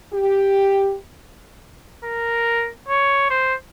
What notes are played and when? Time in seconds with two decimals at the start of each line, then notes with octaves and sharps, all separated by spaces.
0.13 G4
2.05 A#4
2.88 C#5
3.30 C5